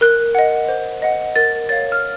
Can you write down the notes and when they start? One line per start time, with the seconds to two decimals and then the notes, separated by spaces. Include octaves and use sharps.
0.01 A#4 F#6
0.35 D#5 F#5
0.69 C5
1.02 D#5 F#5
1.36 A#4 A6
1.69 C#5 F5 A6
1.92 F6